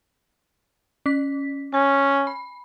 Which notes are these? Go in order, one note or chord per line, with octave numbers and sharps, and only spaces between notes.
C#4 B6
C#4 G#5
B5